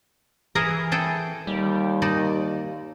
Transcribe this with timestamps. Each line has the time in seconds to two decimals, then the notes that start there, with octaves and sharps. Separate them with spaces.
0.55 E3 G#4 A#4 A#5
0.92 G#4 A4 G5
1.47 D#2 G3
2.02 D#4 D5 A5